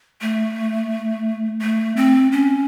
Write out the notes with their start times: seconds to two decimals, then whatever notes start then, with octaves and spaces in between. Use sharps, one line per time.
0.22 A3
1.62 A3
1.96 C4
2.32 C#4